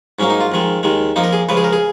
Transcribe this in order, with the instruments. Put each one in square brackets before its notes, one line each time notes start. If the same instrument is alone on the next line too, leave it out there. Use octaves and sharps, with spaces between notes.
[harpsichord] G#2 F#3 A#3 C#4
D#4
F4
F2 D#3 G#3
D#2 D#3 G#3
F2 F3 A#3 D#4
A#4
G#4
C#2 C#3 F3 B4
G#4
A#4
G#4